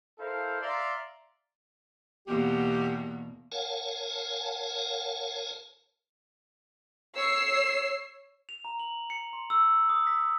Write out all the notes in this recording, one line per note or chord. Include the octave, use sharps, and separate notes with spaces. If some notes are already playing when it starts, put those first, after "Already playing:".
E4 A4 A#4 C5 F5
D5 E5 F5 A#5 C6
E2 B2 A#3 G4
A#4 C#5 F5 F#5 G#5 A5
C#5 E6 C7
F7
A#5
F#7
C#7
C6
E6
D#6
B6